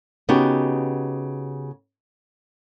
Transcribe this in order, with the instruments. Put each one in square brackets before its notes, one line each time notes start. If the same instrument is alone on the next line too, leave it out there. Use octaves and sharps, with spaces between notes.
[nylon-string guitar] C#3 B3 D#4 F#4 G4